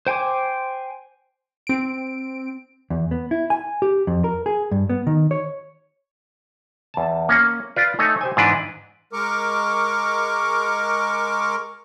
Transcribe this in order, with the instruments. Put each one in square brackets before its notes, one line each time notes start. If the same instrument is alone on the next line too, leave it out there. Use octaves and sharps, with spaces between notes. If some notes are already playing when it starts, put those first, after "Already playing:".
[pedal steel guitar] C5 G5 G#5 C6 D6
[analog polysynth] C4 D7
[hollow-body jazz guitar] E2
B3
E4
G#5
G4
F2
A#4
G#4
G2
B3
D#3
C#5
[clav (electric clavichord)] E2 A5
A#3 C#4
F4 B4 D5
A3 D#4 C#5 D#5 G#5
G4 C5 G#5
G#2 E3 D4 B4
[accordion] G#3 A#4 C#6 D6